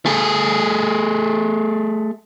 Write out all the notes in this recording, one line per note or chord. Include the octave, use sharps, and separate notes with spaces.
A3 G#4